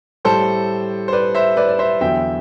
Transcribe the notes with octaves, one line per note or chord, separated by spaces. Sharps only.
A2 G3 A4 C5
C5
B4 D5
C5 E5
B4 D5
D5
C5 E5
E2 D3 F#3 E5 G5